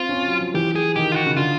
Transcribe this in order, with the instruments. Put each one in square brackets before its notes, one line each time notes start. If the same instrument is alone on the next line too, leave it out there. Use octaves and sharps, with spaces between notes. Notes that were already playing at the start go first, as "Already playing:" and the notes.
Already playing: [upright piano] C4 [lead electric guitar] F4
[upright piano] C#4
C4
F#3
F3
[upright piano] E3 [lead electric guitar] G4
[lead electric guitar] G#4
[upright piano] D#3 [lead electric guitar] G4
[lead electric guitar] F4
F#4
[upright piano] C#3
[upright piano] D3 [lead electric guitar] F4